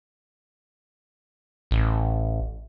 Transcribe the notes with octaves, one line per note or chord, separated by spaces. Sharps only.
A1